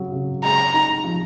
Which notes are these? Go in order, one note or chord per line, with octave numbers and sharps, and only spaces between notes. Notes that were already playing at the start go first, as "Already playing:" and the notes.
Already playing: C#3 F#3
C#3
G#3 A#5
D#4
F3